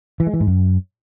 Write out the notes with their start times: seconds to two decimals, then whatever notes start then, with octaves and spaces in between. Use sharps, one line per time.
0.20 E3
0.27 G#3
0.34 E3
0.40 G#2
0.47 F#2